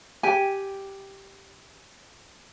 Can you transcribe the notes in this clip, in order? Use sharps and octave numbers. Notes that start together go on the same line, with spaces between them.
G4 G#5